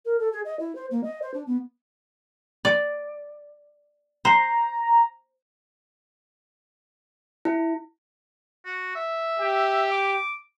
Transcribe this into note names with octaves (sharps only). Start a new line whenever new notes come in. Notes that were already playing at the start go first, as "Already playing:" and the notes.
A#4
A4
G#4
D#5
E4
C5
A#3
D#5
C5
D4
B3
D5
C5 A#5
E4
F#4
E5
G4
D6